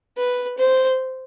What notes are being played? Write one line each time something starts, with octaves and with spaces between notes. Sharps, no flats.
B4
C5